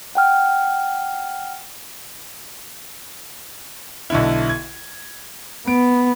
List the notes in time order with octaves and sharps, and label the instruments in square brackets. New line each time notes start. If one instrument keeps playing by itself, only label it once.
[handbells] F#5 G5 F6
[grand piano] B1 D3 E4
G#6
[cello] B3 [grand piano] D7